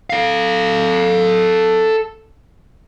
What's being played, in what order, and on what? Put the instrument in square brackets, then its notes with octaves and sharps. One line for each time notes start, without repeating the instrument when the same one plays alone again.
[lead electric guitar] A4 F5